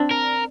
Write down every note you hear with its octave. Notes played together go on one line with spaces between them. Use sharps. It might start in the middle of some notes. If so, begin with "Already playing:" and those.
Already playing: C4 D4
A#4